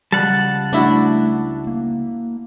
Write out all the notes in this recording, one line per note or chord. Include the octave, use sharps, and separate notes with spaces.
C#2 G3 F#5 A5
A3 D4 E4 F#4
A#3